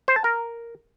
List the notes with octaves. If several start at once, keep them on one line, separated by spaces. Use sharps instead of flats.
C5
A5
A#4